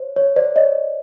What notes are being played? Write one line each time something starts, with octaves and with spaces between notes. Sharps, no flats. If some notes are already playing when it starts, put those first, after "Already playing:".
Already playing: C5 C#5
C#5
C5 D5
C#5 D#5